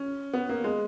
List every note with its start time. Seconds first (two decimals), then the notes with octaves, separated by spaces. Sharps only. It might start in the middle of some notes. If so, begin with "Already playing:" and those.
Already playing: C#4
0.33 B3
0.49 A#3
0.64 G#3